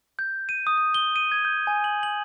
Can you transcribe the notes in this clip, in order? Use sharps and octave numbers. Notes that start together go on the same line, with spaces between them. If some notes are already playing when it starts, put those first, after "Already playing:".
G6
D#7
D#6
D#6
G7
D#7
G#6
G6
G#5
F#7
F#7